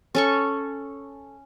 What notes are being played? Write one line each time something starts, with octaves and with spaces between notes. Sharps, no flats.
C#4 A4 C#6